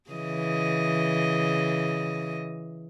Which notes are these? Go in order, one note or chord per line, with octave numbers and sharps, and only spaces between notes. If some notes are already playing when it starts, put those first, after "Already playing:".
C#3 E3 D#5